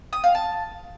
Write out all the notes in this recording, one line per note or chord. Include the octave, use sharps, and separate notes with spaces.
D#6
F5
A5